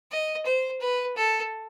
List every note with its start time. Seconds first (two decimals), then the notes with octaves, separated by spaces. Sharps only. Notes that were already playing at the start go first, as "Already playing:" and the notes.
0.11 D#5
0.46 C5
0.81 B4
1.16 A4